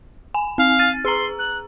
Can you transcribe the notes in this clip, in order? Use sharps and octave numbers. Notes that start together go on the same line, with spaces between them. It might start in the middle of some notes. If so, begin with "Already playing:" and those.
G#5
C4 F5
F6 A6 D#7
G#4 A#5 C6
F#6